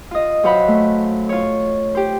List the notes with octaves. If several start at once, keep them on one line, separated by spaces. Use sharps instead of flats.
F4 D#5
F#2 F#4 C5 F5 F#5 B5
A3
F4 C#5
G4 C5